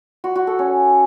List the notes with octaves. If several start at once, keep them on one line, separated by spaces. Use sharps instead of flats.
F#4
F#4
A4
C#4